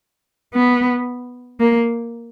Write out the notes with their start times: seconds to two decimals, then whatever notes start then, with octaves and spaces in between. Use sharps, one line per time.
0.54 B3
1.60 A#3